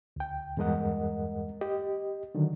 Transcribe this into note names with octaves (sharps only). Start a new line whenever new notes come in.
D2 G5
E2 G2 G#3 A#4 D#5 F#5
G4 D#5
D3 D#3 F#3